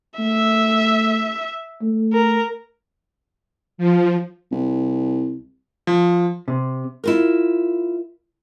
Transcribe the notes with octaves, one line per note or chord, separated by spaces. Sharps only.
A3 E5
A3
A#4
F3
C2
F3
C3
E4 F4 A#4